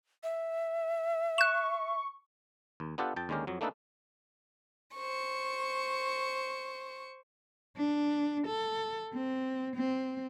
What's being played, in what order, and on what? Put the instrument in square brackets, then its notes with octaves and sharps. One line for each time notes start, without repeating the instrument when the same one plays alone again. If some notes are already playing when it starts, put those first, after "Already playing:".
[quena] E5
[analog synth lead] C#6 [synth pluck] F#6 E7
[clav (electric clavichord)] D#2
B3 D4 F4 G4 A4 F#5
F2 G5 A5
D#2 D3 G#3 C#4 G4 A#4
F2 F#3
A3 A#3 D4 D#4 A4 B4
[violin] C5 C#6
[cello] D4
A4
C4
C4